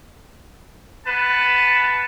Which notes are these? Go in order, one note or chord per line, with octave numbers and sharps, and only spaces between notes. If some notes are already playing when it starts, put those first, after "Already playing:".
B3 B4 A5